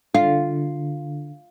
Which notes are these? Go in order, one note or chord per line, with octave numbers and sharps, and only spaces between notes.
D3 F4